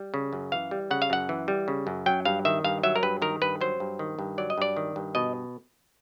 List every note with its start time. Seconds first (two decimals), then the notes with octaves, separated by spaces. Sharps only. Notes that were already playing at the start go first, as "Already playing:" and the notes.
Already playing: G3
0.14 C#3
0.33 F#2
0.52 E3 F5
0.71 G3
0.91 C#3 F#5
1.02 F5
1.10 F#2 F#5
1.29 E3
1.48 G3
1.68 C#3
1.87 F#2
2.06 F#3 G5
2.25 G2 F5
2.45 D#3 E5
2.64 G2 F5
2.83 F#3 E5
2.96 A#4
3.03 G2 B4
3.22 D#3 A#4
3.42 G2 B4
3.61 F#3 C5
3.80 G2
3.99 D#3
4.19 G2
4.38 F#3 D5
4.50 D#5
4.58 G2 D5
4.77 D#3
4.96 G2
5.15 B2 D#5